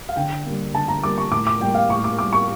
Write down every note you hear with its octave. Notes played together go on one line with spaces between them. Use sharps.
F5
D3 G5
G3 A#3
D3 A5
A#5
G3 A#3 D6
C#6
A2 D6
D6
G3 A#3 G5
F5
A2 C#6
D6
G3 A#3 D6
C#6